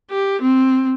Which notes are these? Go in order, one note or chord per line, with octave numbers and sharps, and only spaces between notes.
G4
C4